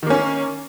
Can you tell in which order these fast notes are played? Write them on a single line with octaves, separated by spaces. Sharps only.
D#3 A#3 C#4